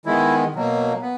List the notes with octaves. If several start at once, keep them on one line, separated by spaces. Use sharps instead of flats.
D#3 G#3 B3 E4
B2 F#3 A#3
B3